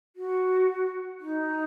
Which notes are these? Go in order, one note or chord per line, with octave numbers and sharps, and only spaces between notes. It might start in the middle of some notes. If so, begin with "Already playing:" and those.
F#4
D#4